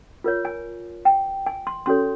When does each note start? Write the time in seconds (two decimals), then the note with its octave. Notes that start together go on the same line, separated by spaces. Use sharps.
0.24 F4 A#4 C#5
0.45 G#5
1.05 G5
1.47 G#5
1.67 C6
1.86 C#4 F#4 A4 C#5 C6